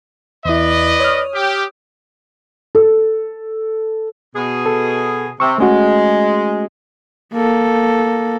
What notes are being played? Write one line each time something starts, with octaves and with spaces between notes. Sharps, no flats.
E2 E4 B4 D5 D#5
C#5 D#6 F6
G4
A4
B2 G#4
A4
C3 C#6 E6
G#3 A3 C#4 F#4
A#3 A4